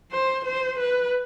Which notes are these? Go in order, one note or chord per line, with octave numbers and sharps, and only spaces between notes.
C5
C5
B4